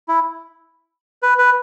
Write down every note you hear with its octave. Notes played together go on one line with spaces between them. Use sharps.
E4
B4
B4